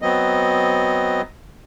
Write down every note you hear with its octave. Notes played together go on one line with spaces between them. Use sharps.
F#3 B3 C4 D#5